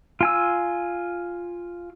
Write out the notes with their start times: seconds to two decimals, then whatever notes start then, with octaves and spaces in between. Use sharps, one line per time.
0.21 F4 G#5 E6